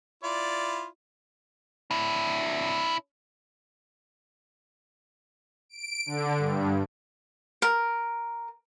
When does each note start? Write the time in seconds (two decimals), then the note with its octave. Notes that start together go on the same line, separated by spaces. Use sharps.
0.24 E4 F4 D5
1.91 D4 E4
5.69 D7
6.06 D3
6.38 G2
7.62 A#4